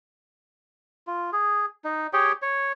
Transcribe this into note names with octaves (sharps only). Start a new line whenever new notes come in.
F4
G#4
D#4
G4 G#4 C#5 G5
C#5